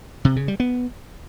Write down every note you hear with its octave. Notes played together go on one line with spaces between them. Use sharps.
C3
C#3
G3
B3